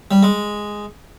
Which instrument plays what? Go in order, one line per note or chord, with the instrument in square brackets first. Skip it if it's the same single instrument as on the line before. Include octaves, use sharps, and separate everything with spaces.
[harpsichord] G3
G#3